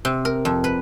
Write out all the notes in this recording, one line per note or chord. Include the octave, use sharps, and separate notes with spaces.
C3
A#4
F2
B4